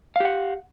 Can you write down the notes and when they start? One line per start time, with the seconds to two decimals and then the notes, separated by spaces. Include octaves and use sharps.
0.16 F5
0.20 G4
0.25 F#5